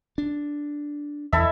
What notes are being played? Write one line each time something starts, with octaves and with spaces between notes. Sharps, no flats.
D4
E2 E4 A4 E5